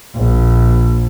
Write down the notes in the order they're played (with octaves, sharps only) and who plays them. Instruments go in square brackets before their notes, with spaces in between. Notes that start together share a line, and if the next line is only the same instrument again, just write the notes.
[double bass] A#1